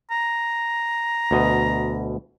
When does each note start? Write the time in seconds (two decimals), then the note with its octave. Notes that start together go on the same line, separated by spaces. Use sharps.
0.11 A#5
1.31 D2 B2 D#5